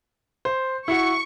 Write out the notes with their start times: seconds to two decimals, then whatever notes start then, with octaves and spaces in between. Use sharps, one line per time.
0.45 C5
0.88 E4 F#4 C#6